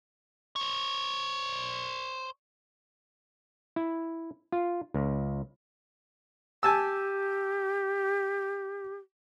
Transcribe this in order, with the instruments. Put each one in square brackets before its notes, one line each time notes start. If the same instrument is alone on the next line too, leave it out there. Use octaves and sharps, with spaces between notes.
[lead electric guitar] C5 C#5
[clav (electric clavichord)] E4
F4
C#2
[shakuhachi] G4 [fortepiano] G#5 A5 E6